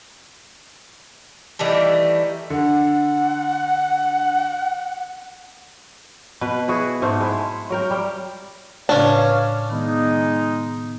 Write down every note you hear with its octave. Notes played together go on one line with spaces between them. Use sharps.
D#3 E3 G3 A3
D3 F#5
B2 B4
E4 F#4 G#4
G#2 A3 C5
G#3 E4 A4
F#3 A#4 G5
G3
A2 C#3 C#4 D4 B4 C#5 F5
D#3 G#3 B3 D#4